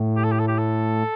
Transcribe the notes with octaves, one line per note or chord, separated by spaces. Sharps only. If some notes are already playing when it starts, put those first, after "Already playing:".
Already playing: A2
G4
A4
G4
A4
G4
A4